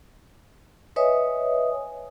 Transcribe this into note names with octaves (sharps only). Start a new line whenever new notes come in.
B4 C#5 D#5 E5 G#5 D#6